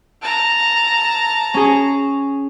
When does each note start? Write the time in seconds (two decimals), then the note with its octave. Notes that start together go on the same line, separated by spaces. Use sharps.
0.22 A5 A#5
1.54 C#4 G#4